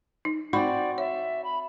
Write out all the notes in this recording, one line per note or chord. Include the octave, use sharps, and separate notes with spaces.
D#4
C4 D#4 F#4 D5 B5
C#5 E5
B5